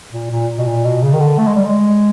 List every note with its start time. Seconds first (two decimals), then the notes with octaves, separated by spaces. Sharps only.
0.12 A#2
0.31 A#2
0.58 B2
0.66 A#2
0.85 B2
1.03 C#3
1.13 D#3
1.20 D3
1.38 A3
1.47 G#3
1.55 G3
1.65 G#3